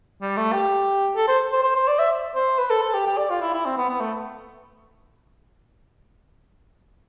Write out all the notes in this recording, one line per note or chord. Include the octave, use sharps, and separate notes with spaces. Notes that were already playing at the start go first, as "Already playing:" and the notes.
G3
A3
G4
A4
C5
C5
C5
C5
D5
E5
C5
B4
A4
A4
G4
G4
D5
F4
E4
E4
C4
B3
B3
A3